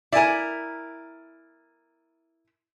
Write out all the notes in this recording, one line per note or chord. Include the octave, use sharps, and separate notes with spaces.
E4 A#4 D5 G#5